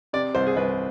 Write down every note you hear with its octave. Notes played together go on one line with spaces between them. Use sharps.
C3 D5
C2 C5
G#4
C2 B4